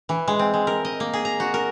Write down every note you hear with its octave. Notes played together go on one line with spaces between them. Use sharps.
E3
G#3
C4
G#3
A#4
D#5
A#3
G#4
A#5
F#4
A#4